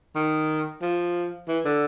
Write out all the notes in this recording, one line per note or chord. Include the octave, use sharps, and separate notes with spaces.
D#3
F3
E3
D3